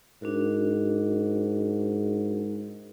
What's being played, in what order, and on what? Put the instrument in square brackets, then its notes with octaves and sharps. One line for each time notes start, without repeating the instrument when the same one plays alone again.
[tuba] G#2 [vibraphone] D4 F#4 A#4